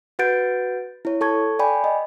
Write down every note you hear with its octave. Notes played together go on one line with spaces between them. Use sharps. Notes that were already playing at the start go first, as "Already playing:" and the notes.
F#4 B4 F#5 G6 A6 D7
E4 C#5
A4 A5 C#6 G#6
D5 G5 G#5 B5
D#5